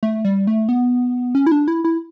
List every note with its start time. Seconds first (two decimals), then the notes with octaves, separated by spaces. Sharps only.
0.03 A3
0.25 G3
0.47 A3
0.69 B3
1.35 C#4
1.47 E4
1.52 D4
1.68 E4
1.84 E4